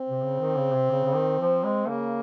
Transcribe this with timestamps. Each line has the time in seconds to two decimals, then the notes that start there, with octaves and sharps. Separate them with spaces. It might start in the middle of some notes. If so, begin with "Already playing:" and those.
Already playing: C4
0.08 C3
0.24 C#3
0.40 D#3
0.57 C#3
0.74 C3
0.91 C#3
1.05 C#3
1.15 D#3
1.39 F3
1.64 G#3
1.88 C#3 A#3